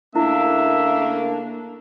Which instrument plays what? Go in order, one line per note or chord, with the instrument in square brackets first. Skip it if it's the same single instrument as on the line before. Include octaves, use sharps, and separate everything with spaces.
[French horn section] C#3 A3 A#3 [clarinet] D4 [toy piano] E4 [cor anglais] E5